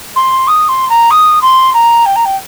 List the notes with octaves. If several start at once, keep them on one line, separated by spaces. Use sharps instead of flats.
C6
D#6
C6
A#5
D#6
C6
A#5
G5
A#5
G5